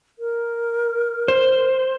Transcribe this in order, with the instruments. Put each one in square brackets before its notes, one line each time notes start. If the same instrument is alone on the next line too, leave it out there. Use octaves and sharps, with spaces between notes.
[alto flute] A#4
[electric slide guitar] C5